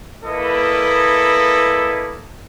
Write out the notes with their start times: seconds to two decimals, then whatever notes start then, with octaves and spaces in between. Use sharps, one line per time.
0.23 A#3 E4 A4 B4 D#5